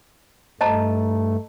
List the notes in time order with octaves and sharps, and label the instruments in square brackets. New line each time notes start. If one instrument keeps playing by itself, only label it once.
[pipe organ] G2 A3 [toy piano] D#5 A5 A#5